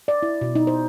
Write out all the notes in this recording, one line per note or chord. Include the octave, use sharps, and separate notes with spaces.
D5
E4
B2
D#4
C5